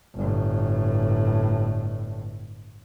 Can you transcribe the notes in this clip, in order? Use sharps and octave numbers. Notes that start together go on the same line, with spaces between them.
G1 A2